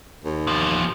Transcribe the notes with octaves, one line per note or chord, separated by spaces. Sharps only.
D#2
E2 F3